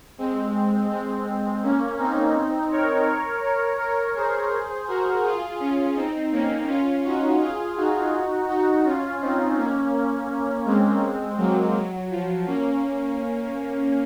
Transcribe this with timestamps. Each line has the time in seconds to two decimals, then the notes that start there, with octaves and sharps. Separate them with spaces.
0.18 G#3 C4
0.90 G#3 C4
1.63 A#3 C#4
1.99 C4 D#4
2.71 A#4 C#5
3.07 A#4 C#5
3.43 A#4 C#5
3.80 A#4 C#5
4.15 G#4 C5
4.87 F#4 A#4
5.23 F4 G#4
5.60 C#4 F4
5.96 C4 D#4
6.32 A#3 C#4
6.68 C#4 F4
7.04 D#4 F#4
7.41 F4 G#4
7.77 D#4 F#4
8.49 D#4 F#4
8.85 C#4 F4
9.22 C4 D#4
9.57 A#3 C#4
10.66 G#3 C4
11.38 F#3 A#3
11.75 F#3
12.10 F3
12.46 A#3 C#4